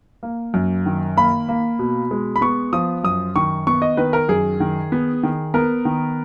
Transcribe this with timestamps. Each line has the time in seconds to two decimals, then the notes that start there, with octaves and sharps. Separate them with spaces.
0.23 A#3
0.54 F#2
0.86 D#3
1.17 A#3 B5
1.49 A#3
1.79 B2
2.11 G#3
2.36 B5
2.41 B3 C#6
2.73 F3 D#6
3.04 F#2 D#6
3.36 D#3 C#6
3.67 B3 C#6
3.82 D#5
3.97 D#3 B4
4.13 A#4
4.29 F#2 G#4
4.60 D#3
4.92 B3
5.23 D#3
5.54 B3 A#4
5.85 D#3